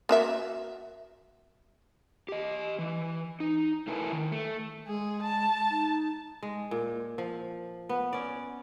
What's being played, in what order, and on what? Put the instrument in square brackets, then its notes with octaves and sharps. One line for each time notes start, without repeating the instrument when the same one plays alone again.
[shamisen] A#3 F#4 E5
[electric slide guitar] G4 D#5
E3
D#4
A3 E4 A#4 B4 G#5 A5
D#3
A3
[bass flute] G#3 [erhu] G#4
[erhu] A5
[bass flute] D#4
[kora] G#3
A#2
F3
B3
C#4 D5